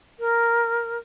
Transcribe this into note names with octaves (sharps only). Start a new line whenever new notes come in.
A#4